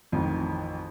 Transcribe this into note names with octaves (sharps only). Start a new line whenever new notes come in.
A1 F2 D#3